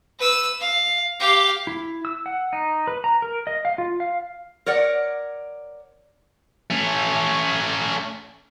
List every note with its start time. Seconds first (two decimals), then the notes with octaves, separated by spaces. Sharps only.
0.19 B4 E6
0.60 F5
1.20 G4 F5
1.67 E4
2.05 E6
2.26 F#5
2.53 D#4
2.87 B4
3.04 A#5
3.22 A#4
3.47 D#5
3.65 F5
3.78 F4
4.00 F5
4.66 A#4 C#5 D5 F#5
6.70 A3 C#4